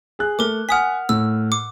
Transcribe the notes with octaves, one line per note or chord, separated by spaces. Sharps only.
G#4 F#6
A3 A#4 D6
F#5 G#5 D#6 F6 B6
A2 E6
D6